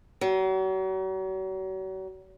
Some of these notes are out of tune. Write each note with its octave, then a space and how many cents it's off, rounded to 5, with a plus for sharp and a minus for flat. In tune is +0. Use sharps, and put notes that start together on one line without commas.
F#3 +40